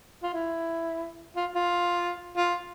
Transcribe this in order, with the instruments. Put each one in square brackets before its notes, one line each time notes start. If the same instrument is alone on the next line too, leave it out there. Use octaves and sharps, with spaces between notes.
[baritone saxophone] F4
E4
F4
F4
F4